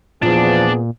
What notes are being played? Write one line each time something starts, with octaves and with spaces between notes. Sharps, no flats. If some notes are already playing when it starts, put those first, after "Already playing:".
E2 A#2 F3 B3 D4 F4 G#4